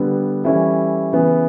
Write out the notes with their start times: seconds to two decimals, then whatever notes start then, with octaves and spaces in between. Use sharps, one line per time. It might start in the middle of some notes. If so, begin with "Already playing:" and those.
Already playing: D3 G3 B3
0.44 E3 G3 C#4 E4 A4
1.12 C#3 E3 B3